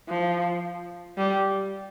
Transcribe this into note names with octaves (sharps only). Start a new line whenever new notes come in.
F3
G3